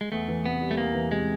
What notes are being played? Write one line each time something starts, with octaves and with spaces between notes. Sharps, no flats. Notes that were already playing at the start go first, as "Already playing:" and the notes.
G#3
E2 A3
E3
C3 B3
G3
A3
E2 A#3
E3
C3 G#3